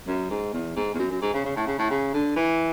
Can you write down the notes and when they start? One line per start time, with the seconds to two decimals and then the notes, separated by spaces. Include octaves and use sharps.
0.07 F#2
0.30 G#2
0.53 E2
0.76 G#2
0.94 E2
0.99 F#2
1.10 F#2
1.21 G#2
1.34 C#3
1.45 C#3
1.56 A2
1.67 C#3
1.78 A2
1.90 C#3
2.14 D3
2.36 E3